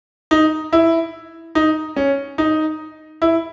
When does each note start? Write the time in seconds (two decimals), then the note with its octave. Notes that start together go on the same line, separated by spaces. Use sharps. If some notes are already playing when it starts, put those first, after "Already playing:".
0.31 D#4
0.73 E4
1.55 D#4
1.96 C#4
2.38 D#4
3.22 E4